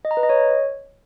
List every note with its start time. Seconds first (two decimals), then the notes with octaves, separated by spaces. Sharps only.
0.05 D#5
0.11 A#5
0.17 B4
0.23 D#5
0.29 C#5